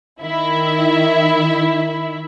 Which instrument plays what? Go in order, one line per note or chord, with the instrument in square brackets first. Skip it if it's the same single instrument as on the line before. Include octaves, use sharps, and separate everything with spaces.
[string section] D#3 E4 E5